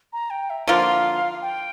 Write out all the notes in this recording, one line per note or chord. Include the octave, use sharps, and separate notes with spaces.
A#5
G5
E5
D3 F3 A#3 F4 F5
G5